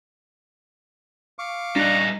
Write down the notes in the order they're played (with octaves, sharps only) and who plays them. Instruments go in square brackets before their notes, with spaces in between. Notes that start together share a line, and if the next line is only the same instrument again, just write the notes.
[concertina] F5 C#6 D6
[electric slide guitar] G3 D#4 [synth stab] D4 F#6 [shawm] A#5